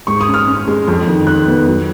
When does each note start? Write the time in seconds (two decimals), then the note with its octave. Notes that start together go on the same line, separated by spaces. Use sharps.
0.07 G#2 C#6
0.21 D#6
0.28 C#4
0.34 F6
0.48 C#4
0.68 G#3
0.87 F2
1.07 D#3
1.27 F2 F#6
1.47 B3
1.67 F#3